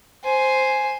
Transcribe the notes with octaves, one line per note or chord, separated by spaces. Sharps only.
C5 G#5